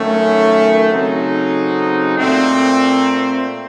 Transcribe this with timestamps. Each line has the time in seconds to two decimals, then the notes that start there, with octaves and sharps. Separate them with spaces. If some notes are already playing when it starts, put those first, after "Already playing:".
Already playing: F#2 D#3 A3 C#4
0.90 C#3 F#3 C4 D#4 A4
2.17 A#2 A3 C4